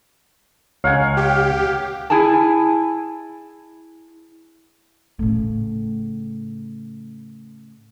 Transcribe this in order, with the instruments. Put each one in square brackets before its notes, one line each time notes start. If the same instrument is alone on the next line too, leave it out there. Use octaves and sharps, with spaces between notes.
[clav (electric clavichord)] C#2 C#5 A#5 [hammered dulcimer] F5 F#5 G#5
[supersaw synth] G4
[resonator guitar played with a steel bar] E4 G#4 G#5 A5
[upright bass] A2 C#3